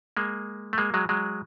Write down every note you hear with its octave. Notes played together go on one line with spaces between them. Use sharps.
G#3 A#3
A3
G#3 A#3
F#3 G#3
F#3 G#3